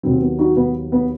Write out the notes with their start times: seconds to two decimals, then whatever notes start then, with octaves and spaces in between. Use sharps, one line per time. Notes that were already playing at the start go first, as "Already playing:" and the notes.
0.03 D#2 D#3 F#3 C4
0.21 B3
0.39 D#4 F#4
0.56 B3
0.92 B3